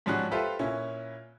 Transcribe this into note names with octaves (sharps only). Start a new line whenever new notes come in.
G#2 F3 G3 C#4 F#4 F#6
F4 G4 A4 B4 C5 E5
A#2 C#4 E4